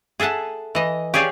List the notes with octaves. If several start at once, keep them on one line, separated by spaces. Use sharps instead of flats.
G#4 A4 E5 F#5 A5
E3 D#5
G4 G#4 C#5 D5 F5